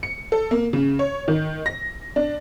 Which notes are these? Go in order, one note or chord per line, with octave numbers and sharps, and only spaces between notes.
C#7
A4
A#3
C#3
C#5
D#3
A#6
D4